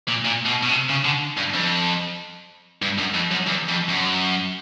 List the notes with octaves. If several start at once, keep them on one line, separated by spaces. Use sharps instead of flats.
A#2
A#2
B2
B2
C3
C#3
D3
G2
F2
G2
F#2
F2
F#2
E2
F2
F#2